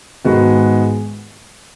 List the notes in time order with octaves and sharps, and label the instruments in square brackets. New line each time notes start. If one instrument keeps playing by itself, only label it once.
[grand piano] G#2 D#3 G#3 B3 F#4